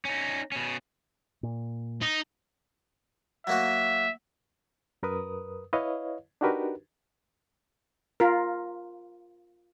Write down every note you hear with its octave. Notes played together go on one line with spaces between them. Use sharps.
C#4 D#4
B2 C#4
A#2
D#4
F#3 A#3 F#4 E5
F#2 A#4 B4 D#6
E4 B4 C#5 D#5 F5
D4 D#4 F#4 G4 A#4 B4
F4 A#4